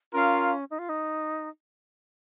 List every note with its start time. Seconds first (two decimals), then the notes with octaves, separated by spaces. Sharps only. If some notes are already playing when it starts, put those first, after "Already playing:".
0.13 C#4 F4 A#4 F5
0.70 D#4
0.79 F4
0.89 D#4